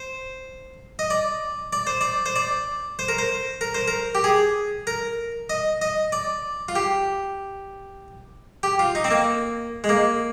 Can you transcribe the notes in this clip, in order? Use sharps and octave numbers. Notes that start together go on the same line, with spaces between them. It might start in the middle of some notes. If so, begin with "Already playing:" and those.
Already playing: C5
D#5
D5
D5
C5
D5
C5
D5
C5
A#4
C5
A#4
C5
A#4
G4
G#4
A#4
D#5
D#5
D5
F4
G4
G4
F4
D#4
C4
A#3
G#3
A#3